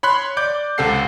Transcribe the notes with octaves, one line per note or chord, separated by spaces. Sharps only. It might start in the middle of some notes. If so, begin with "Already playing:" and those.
C#5 B5 C6 F#6
D5 D6 G6
C#2 C3 G4 A4 F#5 C7